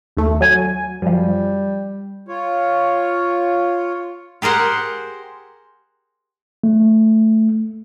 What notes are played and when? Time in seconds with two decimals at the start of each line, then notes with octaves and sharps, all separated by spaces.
0.17 D#2 A3
0.41 F#3 G#5
1.02 F#2 F3 G3
2.28 F4 C#5
4.42 G4 G#4 A#4 C5 F#5
6.64 A3